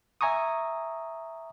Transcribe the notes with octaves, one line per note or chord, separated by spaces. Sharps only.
E5 G#5 A#5 C#6 D#6